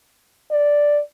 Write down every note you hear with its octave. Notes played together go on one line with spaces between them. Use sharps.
D5